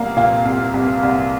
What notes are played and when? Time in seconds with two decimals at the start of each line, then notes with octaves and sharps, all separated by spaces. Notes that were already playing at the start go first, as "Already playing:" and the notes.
Already playing: C2 A#3 F5
0.17 A#2 F5
0.45 C2
0.74 C2
1.03 C2